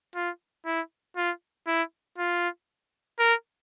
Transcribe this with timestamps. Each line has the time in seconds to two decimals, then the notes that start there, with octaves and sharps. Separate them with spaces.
0.15 F4
0.66 E4
1.16 F4
1.67 E4
2.19 F4
3.19 A#4